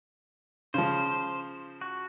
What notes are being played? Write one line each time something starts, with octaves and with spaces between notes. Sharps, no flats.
C#3 F3 C5
F#4